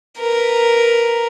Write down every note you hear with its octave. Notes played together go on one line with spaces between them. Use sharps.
A#4 B4